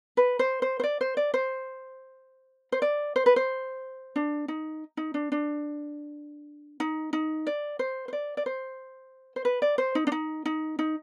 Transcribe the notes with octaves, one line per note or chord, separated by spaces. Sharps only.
B4
C5
C5
C5
D5
C5
D5
C5
C5
D5
C5
B4
C5
D4
D#4
D#4
D4
D4
D#4
D#4
D5
C5
C5
D5
D5
C5
C5
B4
D5
C5
D#4
D4
D#4
D#4
D#4